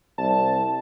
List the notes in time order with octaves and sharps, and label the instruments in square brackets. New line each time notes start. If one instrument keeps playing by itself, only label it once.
[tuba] C2 [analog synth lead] A5